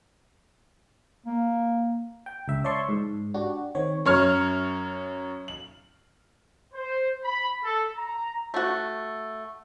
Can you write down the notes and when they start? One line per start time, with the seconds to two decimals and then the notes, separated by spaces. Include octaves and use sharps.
1.26 A#3
2.26 G5
2.48 C#2 E5
2.64 C#5 D5 E5 A5 C6 C#6
2.89 G#2
3.34 D4 F#4 G4
3.75 D#3 C4 C#5
4.05 F#2 C#5 F6
5.48 F#7
6.73 C5
7.24 B5
7.63 A4
7.96 A#5
8.54 A3 F#4